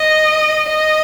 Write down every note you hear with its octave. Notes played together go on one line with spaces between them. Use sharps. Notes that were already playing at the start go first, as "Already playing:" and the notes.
Already playing: D#5
D#5